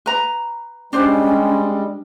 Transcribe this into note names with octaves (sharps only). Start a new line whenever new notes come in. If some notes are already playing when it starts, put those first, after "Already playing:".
B4 A#5
G3 G#3 C#4 D4 C5